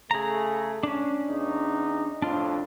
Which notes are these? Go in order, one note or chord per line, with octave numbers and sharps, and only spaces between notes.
C#3 A3 G#4 A#5
C#4 D4
E2 D#4
F2 A2 D4 F4